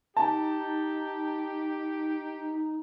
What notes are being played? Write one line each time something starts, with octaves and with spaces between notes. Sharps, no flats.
D#4 G4 A5